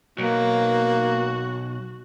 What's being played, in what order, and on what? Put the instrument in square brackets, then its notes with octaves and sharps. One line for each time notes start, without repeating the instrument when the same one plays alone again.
[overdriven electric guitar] B1 [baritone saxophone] A#3 [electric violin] F#4